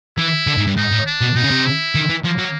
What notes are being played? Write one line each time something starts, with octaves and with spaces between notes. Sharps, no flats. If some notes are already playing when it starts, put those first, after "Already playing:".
E3 E4
D3
G#2
G2
G#2 D#4
A2
D4
B2
B2 D#4
C#3
C3
E4
D#3
E3
F3 A#3
F#3